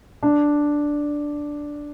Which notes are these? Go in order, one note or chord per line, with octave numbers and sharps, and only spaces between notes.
D4